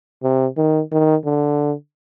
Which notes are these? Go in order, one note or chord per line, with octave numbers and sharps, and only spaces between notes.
C3
D#3
D#3
D3